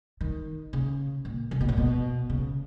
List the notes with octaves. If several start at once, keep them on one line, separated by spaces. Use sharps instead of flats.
D#3
C#3
A#2
C#3
B2
A#2
B2
C#3